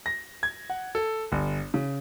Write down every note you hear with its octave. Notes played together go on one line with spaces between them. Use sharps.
A#6
G#6
F#5
A4
G1
C#3